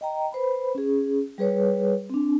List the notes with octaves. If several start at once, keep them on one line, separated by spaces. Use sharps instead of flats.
D#5 G5 A#5
B4 C5 B5
C#4 G#4
G3 G#4 B4 C#5
C4 D4